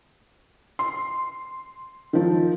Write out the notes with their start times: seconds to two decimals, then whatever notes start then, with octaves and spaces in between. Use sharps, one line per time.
0.79 C6
2.13 D#3 F3